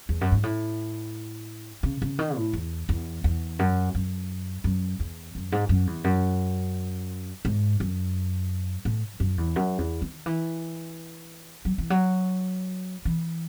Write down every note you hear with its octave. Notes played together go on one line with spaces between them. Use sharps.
E2
F#2
G#2
A2
C#3
C#3
D#3
A2
E2
E2
E2
F#2
F#2
F#2
E2
F#2
G#2
F#2
E2
F#2
G#2
F#2
A2
F#2
E2
F#2
E2
D#3
E3
F#3
E3
F#3
E3